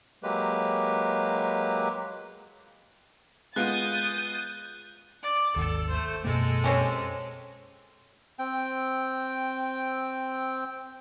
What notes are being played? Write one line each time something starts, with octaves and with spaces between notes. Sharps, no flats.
F#3 G#3 A#3 G4 B4
G#3 B3 F4 D#6 F#6 G6 A6
D5
G#1 D#2 A4
A3 C5
F#2 B2 G#3 A#3 A4
C4 C#4 G4
C4 G5